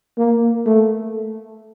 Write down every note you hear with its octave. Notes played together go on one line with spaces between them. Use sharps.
A#3
A3